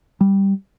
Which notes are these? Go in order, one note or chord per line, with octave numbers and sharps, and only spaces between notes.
G3